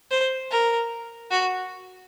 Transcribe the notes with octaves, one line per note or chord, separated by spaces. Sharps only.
C5
A#4
F#4